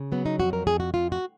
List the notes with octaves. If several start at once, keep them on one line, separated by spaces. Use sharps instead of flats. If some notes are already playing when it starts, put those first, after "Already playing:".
Already playing: C#3
F#3 B3
D#4
F2 F#4
A#4
F2 G#4
F#4
F2 F4
F#4